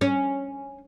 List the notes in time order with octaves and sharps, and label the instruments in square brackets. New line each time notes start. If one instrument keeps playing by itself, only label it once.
[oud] C#4